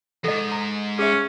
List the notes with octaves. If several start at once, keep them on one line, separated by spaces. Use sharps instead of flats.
F2 G#2 A4 D#5
A#5
C#4 G#4 E5